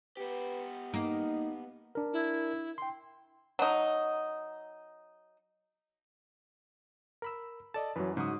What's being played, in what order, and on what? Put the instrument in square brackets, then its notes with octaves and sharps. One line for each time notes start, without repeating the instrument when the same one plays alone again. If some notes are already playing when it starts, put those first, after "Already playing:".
[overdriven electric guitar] B3 G4 [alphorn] B4
[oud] A#3 [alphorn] D#4
[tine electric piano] D4 A#4
[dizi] E4
[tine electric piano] G5 C6
[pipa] F#3 D#4
[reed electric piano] A#4 B5 E6
[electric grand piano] A4 D5 D#5 [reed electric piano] A5
[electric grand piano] F#2 E3 [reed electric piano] F#3 B4
[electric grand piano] G#2 F#4 D#6 [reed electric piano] C#3 F#3